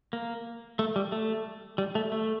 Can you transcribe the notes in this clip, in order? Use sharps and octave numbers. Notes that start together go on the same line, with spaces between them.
A#3
A3
G3
A3
G3
A3
A3